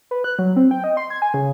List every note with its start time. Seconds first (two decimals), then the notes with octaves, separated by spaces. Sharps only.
0.11 B4
0.24 F#6
0.39 F#3
0.56 C4
0.71 G5
0.84 D#5
0.97 C6
1.10 G#6
1.22 G#5
1.34 C#3